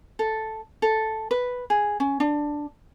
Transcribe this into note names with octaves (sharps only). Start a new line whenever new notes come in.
A4
A4
B4
G#4
C#4
D4